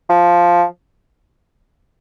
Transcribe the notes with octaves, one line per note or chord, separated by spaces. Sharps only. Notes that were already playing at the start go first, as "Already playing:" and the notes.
F3